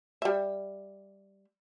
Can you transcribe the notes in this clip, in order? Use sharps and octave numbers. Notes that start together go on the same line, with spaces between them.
G3 E5